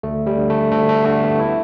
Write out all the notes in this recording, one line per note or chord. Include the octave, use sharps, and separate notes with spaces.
D2 A3
G3
D3
A3
D2 A3
A3
D3 A3
B3
E4